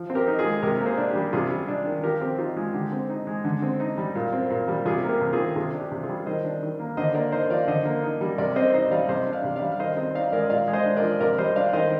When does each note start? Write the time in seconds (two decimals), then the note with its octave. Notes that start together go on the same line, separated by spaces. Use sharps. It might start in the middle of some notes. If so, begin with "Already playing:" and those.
Already playing: F3
0.10 C4
0.15 G4 A#4
0.27 D#4
0.39 F4 G#4
0.45 G#3
0.62 C3 G4 A#4
0.80 A#3
0.86 G#4 C5
0.98 D4
1.10 G4
1.15 G3
1.33 C3 F4 G#4
1.50 G3
1.68 D4
1.86 D#3
2.03 F3 G4 A#4
2.21 C4 G4
2.38 D#4 F4
2.57 G#3 F4
2.74 D3 G4
2.92 C4
3.09 D#4
3.27 G#3
3.44 D3
3.62 C4
3.80 D#4
3.98 G3
4.15 A#2
4.33 C4
4.50 A#2
4.68 G3
4.85 C3 F4 G#4
5.03 A#3
5.09 G4 A#4
5.21 C3
5.33 F4 G#4
5.39 D#3
5.56 C3 F4 G#4
5.74 D4
5.80 G4
5.92 C3
6.03 F4 G#4
6.09 G3
6.26 D#3 C5 D#5
6.45 D4
6.63 D#3
6.79 A#3
6.97 D3 C5 D#5
7.15 A#3 A#4 D5
7.32 D#4 C5 D#5
7.50 F3 D5 F5
7.68 D3 C5 D#5
7.85 A#3
8.03 D#4
8.21 G3
8.38 C3 A#4 D5
8.56 C4 C5 D#5
8.74 D#4 C5 D#5
8.91 G3 D5 F5
9.09 C3 C5 D#5
9.27 D4
9.32 D5 F5
9.44 C3
9.56 D5 F5
9.62 G3
9.72 F5
9.79 D#3 C5 D#5
9.97 C4 C5 D#5
10.15 D#4 D5 F5
10.32 G#3 A#4 D5
10.43 D#5
10.50 A#2 D5 F5
10.68 G#3
10.73 C5 D#5
10.85 D4
10.97 A#4 D5
11.03 F3
11.21 C3 A#4 D5
11.38 G3 C5 D#5
11.56 D4 D5 F5
11.73 D#3 C5 D#5